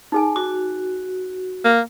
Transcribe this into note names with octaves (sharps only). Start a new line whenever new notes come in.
D#4 G#4 G#5
F#4 D6
A#3